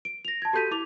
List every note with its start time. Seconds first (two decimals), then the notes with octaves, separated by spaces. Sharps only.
0.05 D7
0.25 A#6 F7
0.42 A5 G#6
0.53 F#4 G4 A4 G6 B6 D#7
0.71 E4 D6 F7